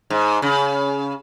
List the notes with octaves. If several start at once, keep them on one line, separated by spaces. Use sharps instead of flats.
G#2
C#3